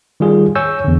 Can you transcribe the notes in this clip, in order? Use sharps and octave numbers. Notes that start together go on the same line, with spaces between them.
D#3 G3 F4 G#4
C#5 G#5 C#6 E6 G6
E2 D3